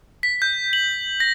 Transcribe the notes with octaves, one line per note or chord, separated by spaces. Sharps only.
B6
G6
F#7
A#6